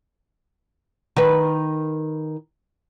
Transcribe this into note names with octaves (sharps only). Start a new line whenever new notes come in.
D#3 B4